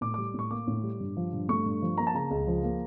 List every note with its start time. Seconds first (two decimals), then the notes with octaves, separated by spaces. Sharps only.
0.01 A2 D6
0.14 G3 D6
0.34 A2 C#6
0.51 A#3 D6
0.67 A2
0.83 G3
1.00 G2
1.17 F3
1.33 G2
1.49 A3 C#6
1.65 G2
1.82 F3
1.98 A#3 A#5
2.07 A5
2.15 C#3 A#5
2.31 C#2
2.47 F3
2.63 A#3